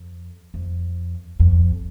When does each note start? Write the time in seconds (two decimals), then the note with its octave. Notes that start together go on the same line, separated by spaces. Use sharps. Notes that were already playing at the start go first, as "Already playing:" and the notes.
Already playing: F2
0.54 F2
1.39 F2